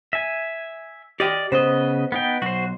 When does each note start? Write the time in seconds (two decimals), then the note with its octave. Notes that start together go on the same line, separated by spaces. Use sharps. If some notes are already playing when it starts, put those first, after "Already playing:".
0.13 E5 G#5
1.20 G4 D5 D#5 G5
1.52 C#3 B3 C5 D#5
2.12 B3 D#4 G5
2.42 B1 F#4 C5